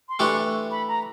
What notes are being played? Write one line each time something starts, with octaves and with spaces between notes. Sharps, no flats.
C6
E3 A3 D4 G4 C#6
B5
A#5